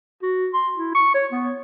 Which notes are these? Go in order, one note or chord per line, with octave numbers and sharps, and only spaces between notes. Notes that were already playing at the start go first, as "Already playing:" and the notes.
F#4
C6
E4
C#6
C#5
B3